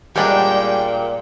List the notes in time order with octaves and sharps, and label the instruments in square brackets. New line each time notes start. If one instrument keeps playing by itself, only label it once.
[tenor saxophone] A#2 [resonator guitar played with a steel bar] G3 G#3 [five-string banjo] B3 D4 D#4 [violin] G5